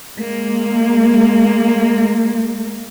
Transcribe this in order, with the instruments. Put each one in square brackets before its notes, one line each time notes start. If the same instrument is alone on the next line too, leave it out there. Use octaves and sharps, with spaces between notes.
[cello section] G#3 A#3